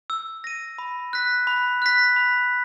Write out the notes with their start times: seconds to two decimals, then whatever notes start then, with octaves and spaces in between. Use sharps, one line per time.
0.10 E6
0.44 A#6 D#7
0.78 B5
1.13 F#6 B6
1.47 B5
1.82 F#6 B6
2.16 B5